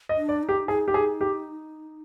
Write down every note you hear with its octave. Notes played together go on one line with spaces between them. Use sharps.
D#5
D4
D5
D#4
G4
D#4 G#4
G4
G#4
G4